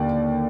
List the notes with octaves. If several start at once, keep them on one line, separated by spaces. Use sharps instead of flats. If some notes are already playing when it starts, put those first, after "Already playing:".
Already playing: D#2 D3 D5